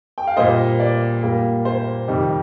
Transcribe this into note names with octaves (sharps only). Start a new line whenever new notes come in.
G5
F5
A#2 G3 A#3 C5 D#5
D5
A#2 G3 A#3
C5
F2 C3 D#3 G3